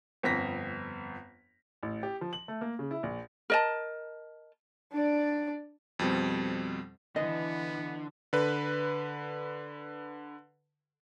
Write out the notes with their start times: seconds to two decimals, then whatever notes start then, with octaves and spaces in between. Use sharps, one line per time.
0.23 G1 F2 A#6 B6
1.83 A1
2.03 G4
2.21 F3
2.33 F#7
2.48 A3
2.61 A#3
2.79 C#3
2.91 E4
3.03 A#1
3.50 A#4 D#5 A5
4.92 D4 D5
5.99 F2 B2 G3 C4
7.16 D3 E3 B3 D#5
8.33 D3 B4